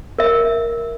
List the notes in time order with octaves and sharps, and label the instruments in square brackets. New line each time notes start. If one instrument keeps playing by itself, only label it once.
[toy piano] A#4 E5